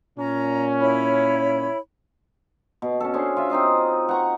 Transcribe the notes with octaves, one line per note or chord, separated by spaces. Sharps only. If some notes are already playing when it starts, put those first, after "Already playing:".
A#2 C#4 A#5
E4 C#5 B5
B2
C#4 A4
C#4 D4 G#4 C5
F4 E5
C4 D#4 D#5 F5
F#5 A#5 C#6